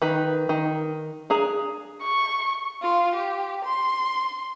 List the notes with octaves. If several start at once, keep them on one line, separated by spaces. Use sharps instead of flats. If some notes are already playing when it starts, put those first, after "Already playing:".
D#3 B4
D#3
D4 G#4 A#5
C#6
F4
G4
C6